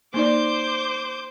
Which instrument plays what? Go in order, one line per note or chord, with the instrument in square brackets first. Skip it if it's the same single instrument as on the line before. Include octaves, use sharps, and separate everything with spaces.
[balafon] A#3 D#4 D5 [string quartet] C5 D6 G6